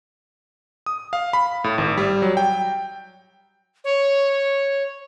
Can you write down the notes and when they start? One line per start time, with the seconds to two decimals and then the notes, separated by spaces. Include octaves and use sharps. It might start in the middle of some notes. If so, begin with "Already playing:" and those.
0.86 D#6
1.13 F5
1.33 B5
1.64 A2
1.78 G#1
1.97 G3
2.22 F#3
2.37 G5
3.84 C#5